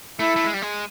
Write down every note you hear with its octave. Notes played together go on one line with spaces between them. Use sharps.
A3 E4
A3
G#3
G3
G#3